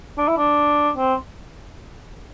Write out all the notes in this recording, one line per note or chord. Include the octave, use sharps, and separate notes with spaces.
D4
E4
D4
C4